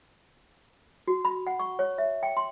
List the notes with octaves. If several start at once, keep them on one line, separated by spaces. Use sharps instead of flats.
F#4
B5
F#5
C#6
C#5
E5
G5
C6